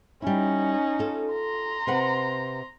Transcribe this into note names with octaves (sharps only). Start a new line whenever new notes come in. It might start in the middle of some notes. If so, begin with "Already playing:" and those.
G3 C#4 D#4 E4
F4 A4
A#5 C6
C3 B4 F#5